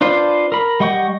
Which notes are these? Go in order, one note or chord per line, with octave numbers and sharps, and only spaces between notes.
D4 F4 B4 C5
A#4 B5
G3 D#5 F#5 C#6 G6